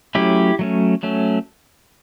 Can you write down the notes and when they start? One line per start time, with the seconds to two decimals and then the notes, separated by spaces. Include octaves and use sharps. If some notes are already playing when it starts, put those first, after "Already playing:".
0.15 F#3 A3 C#4 E4 G4
0.59 F#3 A3 C#4
1.03 F#3 A3 C#4